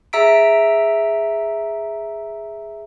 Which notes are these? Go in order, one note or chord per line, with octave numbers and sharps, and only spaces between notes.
G#4 E5 A#5 E6 B6 D7